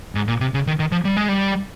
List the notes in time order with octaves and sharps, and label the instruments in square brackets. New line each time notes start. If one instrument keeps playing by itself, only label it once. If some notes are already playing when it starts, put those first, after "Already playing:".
[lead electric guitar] G#2
A#2
C3
C#3
D#3
D#3
F3
G3
G#3
G3